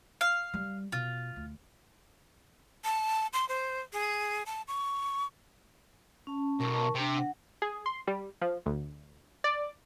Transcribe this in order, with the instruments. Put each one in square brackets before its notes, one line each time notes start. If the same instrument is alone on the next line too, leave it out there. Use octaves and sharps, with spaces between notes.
[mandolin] F5
[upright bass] G3
[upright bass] B2 [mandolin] F4
[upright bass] D2
[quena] A5
C6
C5
G#4
A5
C#6
[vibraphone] C#4 A5
[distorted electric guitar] B1 [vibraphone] A#4 A5 C#6
[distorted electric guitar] C3 [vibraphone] D4 G5
[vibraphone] F#5
[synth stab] G#4
C6
G3
F3
D2
D5